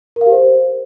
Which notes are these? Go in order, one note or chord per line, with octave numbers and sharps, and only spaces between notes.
A#4
F5
G4
C5